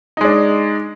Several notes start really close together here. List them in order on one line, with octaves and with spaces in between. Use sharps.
D#4 G#3 D4